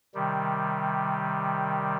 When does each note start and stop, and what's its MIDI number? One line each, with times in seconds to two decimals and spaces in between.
0.15 1.97 48
0.15 1.97 51
0.15 1.97 55